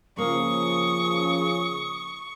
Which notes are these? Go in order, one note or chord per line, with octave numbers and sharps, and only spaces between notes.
C#3 F3 A#3 C#6 D#6